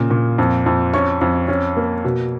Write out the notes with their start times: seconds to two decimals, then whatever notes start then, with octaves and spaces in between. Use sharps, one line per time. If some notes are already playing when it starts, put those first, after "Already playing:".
Already playing: A#2 C#3
0.10 A#2
0.38 F2
0.66 F2
0.94 C#4 C#6
1.21 F2
1.48 C#4
1.77 A#3
2.05 B2